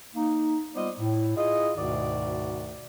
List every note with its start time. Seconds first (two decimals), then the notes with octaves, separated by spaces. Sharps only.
0.15 A#3 D#4
0.75 G3 B3 F4 C5 D5 D#5
0.99 A2
1.37 E4 F4 G#4 D#5
1.75 D2 G#2 B2 D#3 F#4 D5